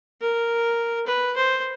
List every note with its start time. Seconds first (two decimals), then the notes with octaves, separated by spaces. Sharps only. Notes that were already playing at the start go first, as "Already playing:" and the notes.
0.21 A#4
1.06 B4
1.36 C5